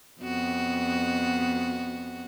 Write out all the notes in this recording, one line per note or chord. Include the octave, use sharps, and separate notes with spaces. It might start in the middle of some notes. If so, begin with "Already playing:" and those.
F2 B3 F#4